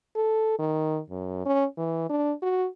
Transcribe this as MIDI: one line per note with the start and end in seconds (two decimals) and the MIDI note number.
0.16 0.59 69
0.59 1.00 51
1.10 1.43 42
1.46 1.65 61
1.77 2.09 52
2.10 2.32 62
2.42 2.67 66